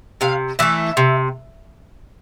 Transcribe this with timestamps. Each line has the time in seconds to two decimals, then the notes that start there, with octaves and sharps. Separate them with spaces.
0.21 C3 F5
0.59 E3 A3 E5
0.97 C3